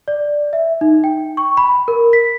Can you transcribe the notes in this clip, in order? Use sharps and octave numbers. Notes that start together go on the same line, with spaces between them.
D5
E5
D#4
G5
C#6
B5
A#4
B6